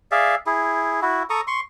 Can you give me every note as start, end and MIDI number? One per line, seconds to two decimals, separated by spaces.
0.11 0.35 68
0.11 0.35 74
0.11 0.35 76
0.11 0.35 77
0.46 1.00 64
0.46 1.00 68
1.02 1.23 64
1.02 1.23 66
1.30 1.41 69
1.30 1.41 82
1.30 1.41 85
1.30 1.41 87
1.47 1.60 84
1.47 1.60 85